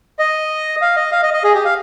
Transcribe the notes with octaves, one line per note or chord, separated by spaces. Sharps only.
D#5
F5
D#5
F5
D#5
D#5
G#4
G4
F5